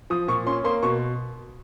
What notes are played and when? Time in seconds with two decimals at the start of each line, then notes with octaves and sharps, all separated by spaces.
0.10 F3 D#6
0.28 A#2 C#6
0.46 C#4 C6
0.64 A#3 C6
0.83 B2 C#6